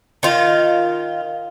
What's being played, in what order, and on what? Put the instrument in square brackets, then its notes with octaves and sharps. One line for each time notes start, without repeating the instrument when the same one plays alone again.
[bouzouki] D#3 F4